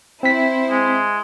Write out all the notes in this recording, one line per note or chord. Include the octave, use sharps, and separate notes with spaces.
C4 E4 C5 B6
G#3